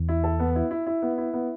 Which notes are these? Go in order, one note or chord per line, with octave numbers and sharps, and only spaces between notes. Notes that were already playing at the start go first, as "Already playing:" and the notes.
Already playing: E2 E3
E4
A4
B3
E4
E4
E4
B3
E4
B3